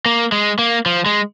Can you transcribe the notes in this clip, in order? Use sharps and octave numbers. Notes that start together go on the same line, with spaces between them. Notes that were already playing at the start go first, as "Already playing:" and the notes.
A#3
G#3
A#3
F3
G#3